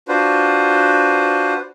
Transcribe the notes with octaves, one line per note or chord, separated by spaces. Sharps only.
D4 F4 F#4 B4 C5